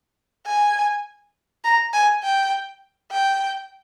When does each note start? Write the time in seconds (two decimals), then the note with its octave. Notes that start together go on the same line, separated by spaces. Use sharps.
0.46 G#5
1.64 A#5
1.94 G#5
2.23 G5
3.11 G5